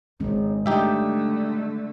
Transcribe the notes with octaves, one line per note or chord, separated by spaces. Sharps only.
G#1 D#3 G#3 C#4
D3 G3 A3 D#4 G4 E5